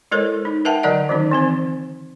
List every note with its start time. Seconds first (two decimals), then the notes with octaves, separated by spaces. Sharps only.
0.11 G#3 E4 A4 A#4 C5 C#5
0.45 D#4
0.65 A#4 B4 E5 F#5 G5 A5
0.83 D3 F#3 A#4 D5 D#5 F#5
1.09 D#3 F#3 C#4 D#4
1.31 E3 C4 C5